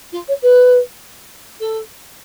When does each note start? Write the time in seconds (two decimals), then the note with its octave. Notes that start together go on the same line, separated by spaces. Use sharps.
0.12 F4
0.28 C#5
0.42 B4
1.60 A4